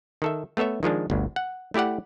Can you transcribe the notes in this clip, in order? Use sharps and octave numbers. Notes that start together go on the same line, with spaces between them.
D#3 A4 E5
A3 B3 A4 C#5 E5
D#3 F3 G#3 D4
G1 D2
F#5
A3 E4 G4 D5 F#5